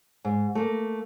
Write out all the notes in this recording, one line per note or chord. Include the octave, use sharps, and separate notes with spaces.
G#2
A3 A#3